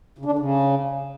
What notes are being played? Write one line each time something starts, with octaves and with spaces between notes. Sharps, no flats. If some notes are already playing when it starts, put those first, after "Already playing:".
C#3
D4
D3
C#3